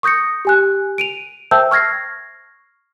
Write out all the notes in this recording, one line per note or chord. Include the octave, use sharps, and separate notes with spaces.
C#6 D#6 G6 A#6 C#7
G4 G#5 F#6
D7 D#7 F7
C5 E5 G5 A5 E6 G6
C#6 F6 G#6 A#6 C7